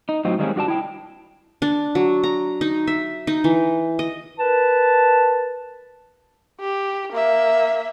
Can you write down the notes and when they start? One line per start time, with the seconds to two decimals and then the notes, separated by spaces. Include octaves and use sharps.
0.09 D#4
0.25 A2 F#3 C4 D#4 F4
0.39 D#3 G3 G#3 A#3 C4 C#4
0.56 G2 F#4 D5 A5
0.68 E4 G5
1.62 D4
1.95 F#3
2.24 A#5
2.61 D#4
2.87 E5
3.27 D#4
3.44 E3
3.99 D#5
4.40 A#4 B4 A5
6.60 G4
7.12 A#3 E5